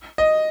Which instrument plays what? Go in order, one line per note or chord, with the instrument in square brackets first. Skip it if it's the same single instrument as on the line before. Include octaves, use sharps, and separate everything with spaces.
[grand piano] D#5